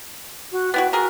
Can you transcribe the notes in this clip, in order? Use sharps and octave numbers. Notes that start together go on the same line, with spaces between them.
F#4
B3 E4 F#4 G5
F#4 G#4 A#4